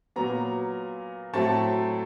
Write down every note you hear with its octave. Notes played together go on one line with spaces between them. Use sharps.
A#2 F#3 B3 A#5
A2 F#3 A3 C4 A5